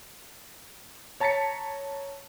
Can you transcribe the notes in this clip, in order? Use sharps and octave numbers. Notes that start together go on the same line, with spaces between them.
C#5 A5 A#5 A6 B6 C#7